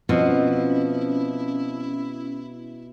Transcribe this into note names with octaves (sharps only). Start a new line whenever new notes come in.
B2 F3 C4 C#4 E4 F4